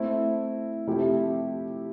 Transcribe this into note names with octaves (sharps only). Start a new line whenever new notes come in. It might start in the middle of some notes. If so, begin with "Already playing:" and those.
Already playing: A3 C4 E4
C3 F3 A3 E4 G4